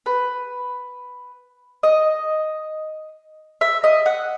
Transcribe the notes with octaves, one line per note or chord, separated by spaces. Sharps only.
B4
D#5
E5
D#5
F#5